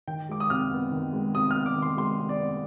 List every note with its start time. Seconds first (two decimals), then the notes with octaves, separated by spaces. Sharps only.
0.07 D#3 G5
0.29 G#3 D6
0.40 D#6
0.50 C3 F6
0.71 B3
0.91 D#3
1.13 G#3
1.35 C3 D#6
1.51 F6
1.55 B3
1.66 D6
1.76 D#3
1.82 C6
1.97 G#3 C6
2.19 C3
2.29 D5
2.40 B3